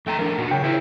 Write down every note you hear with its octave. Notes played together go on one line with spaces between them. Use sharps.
F2 A3 G5 A#5
F3 D4 A#4
A#2 F#4
C#3 F#3 G5
E4 G#4 A#4 C5